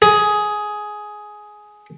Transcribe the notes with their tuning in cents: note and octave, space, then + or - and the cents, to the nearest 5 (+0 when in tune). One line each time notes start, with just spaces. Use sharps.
G#4 +10